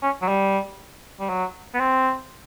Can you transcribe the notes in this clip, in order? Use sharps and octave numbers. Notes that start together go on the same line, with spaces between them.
C#4
F#3
G3
G3
F#3
B3
C4